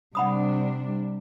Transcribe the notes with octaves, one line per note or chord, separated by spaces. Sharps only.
C3 G3 D4 F#5 B5 D#6